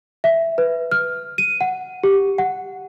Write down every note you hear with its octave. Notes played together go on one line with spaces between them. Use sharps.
E5
B4
F6
D#7
F#5
G4
F#5